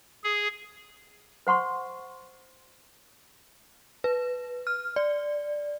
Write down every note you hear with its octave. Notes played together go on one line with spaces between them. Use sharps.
G#4
C5 F#5 C6 C#6
B4
F6
D5